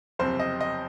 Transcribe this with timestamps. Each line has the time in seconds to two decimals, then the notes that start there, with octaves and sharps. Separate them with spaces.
0.19 F#1 F2 C3 C5
0.40 D#5
0.61 D#5